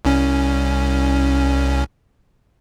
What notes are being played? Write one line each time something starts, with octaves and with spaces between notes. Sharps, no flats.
C2 C#4